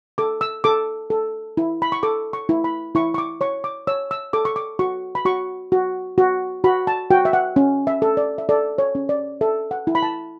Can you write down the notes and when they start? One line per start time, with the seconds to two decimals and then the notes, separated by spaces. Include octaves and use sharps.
0.18 A4 D6
0.41 E6
0.64 A4 D6
1.10 A4
1.57 E4
1.82 B5
1.92 C#6
2.03 A4 D6
2.33 C#6
2.49 E4
2.64 B5
2.95 E4 C#6
3.14 C#6
3.18 D6
3.41 C#5 C#6
3.64 D6
3.87 C#5 E6
4.11 E6
4.33 A4 D6
4.45 C#6
4.56 D6
4.79 F#4 C#6
5.15 B5
5.25 F#4 C#6
5.72 F#4
6.18 F#4
6.64 F#4 B5
6.87 A5
7.11 F#4 G5
7.25 E5
7.33 F#5
7.56 C#4
7.87 E5
8.02 A4
8.17 D5
8.38 E5
8.49 A4 D5
8.78 C#5
8.95 C#4
9.09 D5
9.41 A4 E5
9.71 F#5
9.87 E4
9.95 B5
10.03 A5